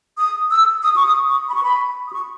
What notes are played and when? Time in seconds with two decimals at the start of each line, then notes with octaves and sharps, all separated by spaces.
0.19 D#6
0.51 E6
0.83 D#6
0.95 C#6
1.05 D#6
1.27 C#6
1.48 B5
1.55 C#6
1.63 B5
2.07 D#6
2.13 C#6